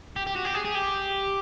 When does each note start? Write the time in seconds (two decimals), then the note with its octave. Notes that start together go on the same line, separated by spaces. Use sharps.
0.16 G4
0.27 G4
0.36 F#4
0.45 G4
0.55 G#4
0.65 G#4
0.75 G4